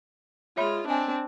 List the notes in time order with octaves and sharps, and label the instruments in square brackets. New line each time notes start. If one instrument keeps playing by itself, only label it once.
[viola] G#3 F4 [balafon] C#5 E5 B5
[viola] C4 D4 [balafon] D#5 G#5